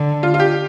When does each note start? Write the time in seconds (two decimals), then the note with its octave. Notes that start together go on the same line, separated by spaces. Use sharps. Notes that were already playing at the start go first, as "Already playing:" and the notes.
Already playing: D3
0.23 F4
0.34 F4
0.40 G4